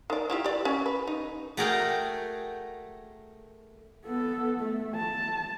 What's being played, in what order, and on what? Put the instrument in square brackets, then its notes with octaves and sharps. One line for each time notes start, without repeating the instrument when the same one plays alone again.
[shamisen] D#3 D5
E4 F4 G4
G4 D5
C#4
B4
D#4
[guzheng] A3 F#4 G#4 A#4 G5
[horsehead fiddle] B3 A4
A3
A5